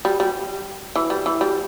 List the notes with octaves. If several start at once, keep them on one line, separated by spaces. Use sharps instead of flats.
G3
G3
E3
G3
E3
G3